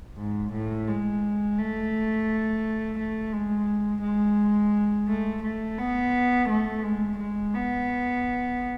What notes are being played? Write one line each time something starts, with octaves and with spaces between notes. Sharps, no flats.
G#2
A2
G#3
A3
A3
G#3
G#3
A3
A3
B3
A3
G#3
G#3
B3